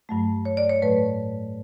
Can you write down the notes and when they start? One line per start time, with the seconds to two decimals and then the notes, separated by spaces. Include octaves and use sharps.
0.09 G2 F#3 A3
0.45 C#5
0.57 D5
0.69 C#5
0.82 A2 F#3 A3 B4